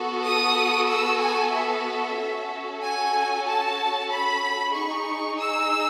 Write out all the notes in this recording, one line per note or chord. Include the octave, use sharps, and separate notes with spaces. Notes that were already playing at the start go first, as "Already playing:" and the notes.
Already playing: B3 F#4 A4
D#6
E6
G#5
E5
C#4 F#4 A4
G#5
A5
B5
D#4 G#4 C#6
E6